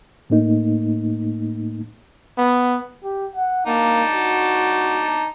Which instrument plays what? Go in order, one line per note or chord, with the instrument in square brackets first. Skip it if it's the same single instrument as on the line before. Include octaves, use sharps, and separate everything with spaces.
[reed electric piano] A2 A3 A#3 D#4
[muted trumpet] B3
[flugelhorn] G4
F#5
[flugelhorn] A#3 [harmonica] D#4 A5 D6
[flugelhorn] F#4